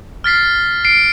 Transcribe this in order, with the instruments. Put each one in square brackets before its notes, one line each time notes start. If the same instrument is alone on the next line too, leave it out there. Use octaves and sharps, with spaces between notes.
[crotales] F6 A6 B6 C7
C7 D7